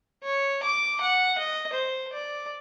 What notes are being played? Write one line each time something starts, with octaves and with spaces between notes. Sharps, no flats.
C#5
D6
F#5
D#5
C5
D5